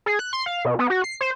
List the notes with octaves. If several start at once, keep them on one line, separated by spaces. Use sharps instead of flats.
G#4
F#6
C6
F5
B2
B3
F#4
C7
C5